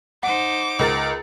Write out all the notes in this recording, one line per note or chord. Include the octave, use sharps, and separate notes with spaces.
D#4 C5 F#5 D6
C#2 A#4 A6